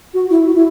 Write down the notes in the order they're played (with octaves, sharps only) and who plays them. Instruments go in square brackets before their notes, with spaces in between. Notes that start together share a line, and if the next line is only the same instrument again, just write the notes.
[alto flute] F#4
E4
F#4
E4